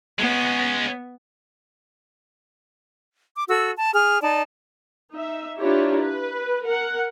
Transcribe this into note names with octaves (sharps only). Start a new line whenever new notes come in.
G#3 B3 C#4
D6
F#4 A4 E6
A5
G#4 F6
D#4 D5 A5
D#4 E5
D4 E4 F4 G4 C#5 A#5
B4
A#4 F#5